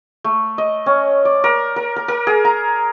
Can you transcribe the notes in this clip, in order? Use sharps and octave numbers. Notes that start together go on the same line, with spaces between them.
A3
D#5
C#4
D5
A#4
A#4
A#4
A#4
G#4
A#5